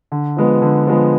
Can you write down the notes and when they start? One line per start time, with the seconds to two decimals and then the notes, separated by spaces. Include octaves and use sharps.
0.12 D3
0.37 F3 G#3 B3
0.62 D3
0.87 F3 G#3 B3